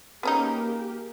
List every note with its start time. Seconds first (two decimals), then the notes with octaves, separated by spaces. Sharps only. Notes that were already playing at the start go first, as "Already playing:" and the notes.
0.23 A#3 B3 C#4 D#4 G4 G#4